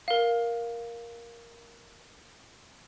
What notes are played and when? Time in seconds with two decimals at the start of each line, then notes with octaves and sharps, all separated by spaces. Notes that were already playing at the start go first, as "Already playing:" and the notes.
0.08 A#4 F5